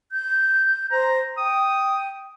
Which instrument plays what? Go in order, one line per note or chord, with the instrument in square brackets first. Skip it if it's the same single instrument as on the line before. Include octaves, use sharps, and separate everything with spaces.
[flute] G6
[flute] C5 [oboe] A#5
[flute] G5 [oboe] D#6